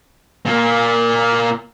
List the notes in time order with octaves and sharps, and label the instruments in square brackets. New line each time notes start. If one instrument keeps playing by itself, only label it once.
[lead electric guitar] A#2 A#3